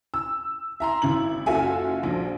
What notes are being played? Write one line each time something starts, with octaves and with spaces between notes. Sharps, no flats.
E6
E5 A#5 C6
G#1 E4 F#7
F#1 F4 F#4 A4 E5 G#5
A#1 F3